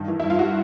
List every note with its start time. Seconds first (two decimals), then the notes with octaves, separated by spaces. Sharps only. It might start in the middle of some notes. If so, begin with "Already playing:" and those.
Already playing: G2 D#3
0.08 E3
0.20 G2 E4
0.30 F4
0.39 G3 F#4